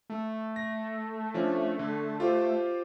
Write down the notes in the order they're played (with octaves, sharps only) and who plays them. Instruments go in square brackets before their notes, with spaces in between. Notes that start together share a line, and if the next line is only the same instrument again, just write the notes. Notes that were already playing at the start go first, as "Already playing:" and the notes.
[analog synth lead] A3
[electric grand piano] A#6
F3 C#4 D4
D3
F4 G4 C5